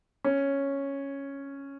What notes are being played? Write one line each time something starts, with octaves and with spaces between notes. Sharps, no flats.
C#4